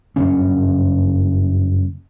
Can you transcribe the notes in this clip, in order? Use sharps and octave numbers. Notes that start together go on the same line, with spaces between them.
F#1 G2 C#3 C#4